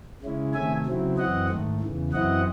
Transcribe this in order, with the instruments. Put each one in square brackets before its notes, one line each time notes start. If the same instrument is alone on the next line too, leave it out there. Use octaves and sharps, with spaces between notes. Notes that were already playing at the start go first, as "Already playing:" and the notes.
[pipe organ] C#3 G#3 C#4 E4
C3 D#3 A3 E5 G#5
C#3 F#3 C4 E4
F#2 E3 C4 D#5 F#5
G#2 D#3 A3
E2 C#3 E3
F#2 E3 C4 E4 D#5 F#5